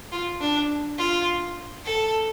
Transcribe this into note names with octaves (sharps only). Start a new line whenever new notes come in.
F4
D4
F4
A4